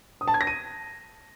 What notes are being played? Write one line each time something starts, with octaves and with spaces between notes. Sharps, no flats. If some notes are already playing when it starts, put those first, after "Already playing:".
D#6
A5
G#6
A#6
D#7